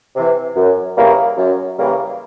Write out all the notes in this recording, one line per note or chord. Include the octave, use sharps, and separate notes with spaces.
C3 E3
F#2
C#3 E3 G3 A#3
F#2
C#3 E3 G3 A#3